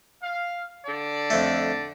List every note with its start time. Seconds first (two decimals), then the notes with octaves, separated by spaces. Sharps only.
0.23 F5
0.86 D3 D5 A5
1.30 F2 A3